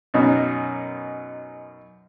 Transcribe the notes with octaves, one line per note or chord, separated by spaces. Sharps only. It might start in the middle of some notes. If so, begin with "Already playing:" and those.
F#2 B2 D#4